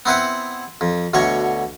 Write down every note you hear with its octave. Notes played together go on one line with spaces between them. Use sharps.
B3 C4 E4 B4 F#5
F2
D2 B2 D3 C#5 C#6